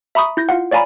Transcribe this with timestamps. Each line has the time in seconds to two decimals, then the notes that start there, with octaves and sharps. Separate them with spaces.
0.15 E5 A#5 B5 C#6 D#6
0.37 E4 G6 A#6
0.49 F4 F5 F#5
0.71 C#5 D5 F5 G#5 A#5 B5